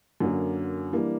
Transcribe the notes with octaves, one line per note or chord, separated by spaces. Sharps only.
F#2 D3 F#3 A#3
E3 G3 A#3 D4